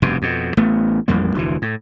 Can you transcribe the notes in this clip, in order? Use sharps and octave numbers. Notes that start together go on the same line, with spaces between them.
F1 G2 B2
F2 B2
A1 A3 B3
A1 F2 G3 A#3
F1 D2 E3
A2